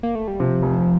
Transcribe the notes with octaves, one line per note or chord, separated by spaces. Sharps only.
A#3
A3
G3
C3 F3
F1